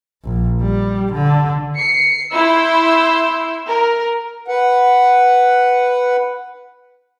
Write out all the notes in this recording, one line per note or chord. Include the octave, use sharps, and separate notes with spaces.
A#1
G3
D3
C7 C#7
E4 C6 E6 G6
A#4
B4 F#5